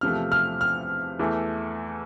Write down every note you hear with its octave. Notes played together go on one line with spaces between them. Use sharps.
E2 C3 F3 A3 F6
F6
F6
E2 E3 A3